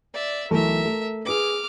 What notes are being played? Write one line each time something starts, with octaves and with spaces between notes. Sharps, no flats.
D5 E5
B1 E3 A3 A#4 E5
A3
G#4 B4 D6 F6